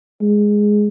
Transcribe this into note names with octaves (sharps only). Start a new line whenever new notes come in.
G#3